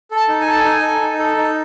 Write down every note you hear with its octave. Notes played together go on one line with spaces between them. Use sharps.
A4
A5
D#4
G#5
A4 A5
D#4 G#5
A4
D#4
A4
D#4